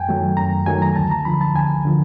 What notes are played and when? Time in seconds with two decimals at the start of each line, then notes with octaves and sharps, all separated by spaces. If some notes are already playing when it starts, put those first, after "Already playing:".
Already playing: F#2 G5 G#5
0.09 D#3 F#3 A3
0.37 F#2 A#5
0.66 D#3 F#3 A3 G#5
0.82 A#5
0.96 D2 A5
1.11 A#5
1.25 D3 F3 B5
1.41 A5
1.55 D2 G#5
1.85 D3 F3